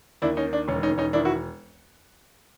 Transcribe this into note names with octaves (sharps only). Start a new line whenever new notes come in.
D#2 D4 E4
C#4 D#4
D#3
D4
E1 C#4
C#4 D#4
E1
C#4 D#4
D#3 D4 E4
E4 F#4